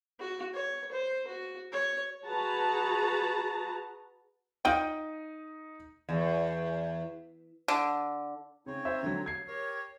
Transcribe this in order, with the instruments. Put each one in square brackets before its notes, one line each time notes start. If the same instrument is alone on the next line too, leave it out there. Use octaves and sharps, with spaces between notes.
[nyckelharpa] F#4
C#5
C5
F#4
C#5
[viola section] F#4 G#4 B4 A5 A#5
[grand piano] D#4 D#7 [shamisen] F4 D5 G5
[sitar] E2
[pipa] D3
[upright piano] C#3 [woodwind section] C4 D#4 C#5
[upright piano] C5 E5
D3 F#3
G#6 C7
[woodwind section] G4 A#4 C#5